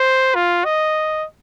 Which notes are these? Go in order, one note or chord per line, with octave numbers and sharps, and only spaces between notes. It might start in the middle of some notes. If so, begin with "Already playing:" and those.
Already playing: C5
F4
D#5